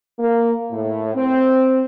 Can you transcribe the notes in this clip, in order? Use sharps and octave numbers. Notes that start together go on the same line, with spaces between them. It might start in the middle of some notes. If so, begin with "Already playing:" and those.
A#3
A2
C4